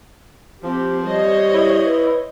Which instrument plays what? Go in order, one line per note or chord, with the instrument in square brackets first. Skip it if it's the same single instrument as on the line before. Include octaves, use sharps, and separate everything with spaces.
[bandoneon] F3 [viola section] C4 G4
[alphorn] G3 [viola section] C5 C#5 D#5
[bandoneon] E4
[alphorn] B4